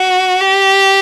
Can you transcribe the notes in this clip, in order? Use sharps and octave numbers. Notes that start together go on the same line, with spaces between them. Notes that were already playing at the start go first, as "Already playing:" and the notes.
Already playing: F#4
G4